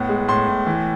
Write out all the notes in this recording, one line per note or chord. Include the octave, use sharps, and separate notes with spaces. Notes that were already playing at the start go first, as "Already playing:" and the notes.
Already playing: A2 B3
G#3
A2 C6
A2
E3